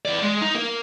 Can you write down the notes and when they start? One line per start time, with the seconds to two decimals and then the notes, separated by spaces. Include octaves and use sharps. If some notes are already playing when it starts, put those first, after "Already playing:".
0.05 E3 D5
0.22 G#3
0.42 D#4
0.55 A#3 A#4